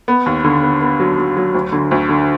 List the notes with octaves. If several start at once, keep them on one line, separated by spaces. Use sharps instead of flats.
B3
D#2
D3
B3
B3
F#3
F#3
F#3
D2
D3
D2
D3